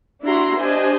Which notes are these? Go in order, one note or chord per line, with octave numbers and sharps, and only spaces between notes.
D4 E4 F#4 G4 A#5 C6
D4 G4 C5 D#5 G#5